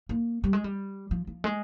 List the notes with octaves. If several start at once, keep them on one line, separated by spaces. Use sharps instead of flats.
A#3
G3
G#3
G3
F3
F3
G#3